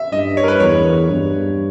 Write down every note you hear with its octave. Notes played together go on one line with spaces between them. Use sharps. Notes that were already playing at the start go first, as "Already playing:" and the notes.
Already playing: E5
G2 D#5
C#5
A#4
B4
E2 C#5
G2